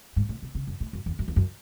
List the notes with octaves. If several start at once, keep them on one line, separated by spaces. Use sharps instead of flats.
G#2
A2
B2
C#3
F#2
A2
F#2
E2
F#2
E2
F#2